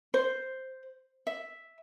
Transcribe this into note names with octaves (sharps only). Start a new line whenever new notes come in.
C5
E5